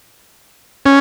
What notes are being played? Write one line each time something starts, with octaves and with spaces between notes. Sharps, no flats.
C#4